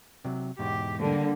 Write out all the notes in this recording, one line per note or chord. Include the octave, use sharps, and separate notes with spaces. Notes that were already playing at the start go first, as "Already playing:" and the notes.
C3 F#3
E2 G#2 B2 G4
D3 G3 A#3